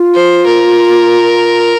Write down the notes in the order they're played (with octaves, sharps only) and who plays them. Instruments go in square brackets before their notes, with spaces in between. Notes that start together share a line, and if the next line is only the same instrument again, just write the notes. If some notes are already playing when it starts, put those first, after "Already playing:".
Already playing: [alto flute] F4
[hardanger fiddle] C5
A#4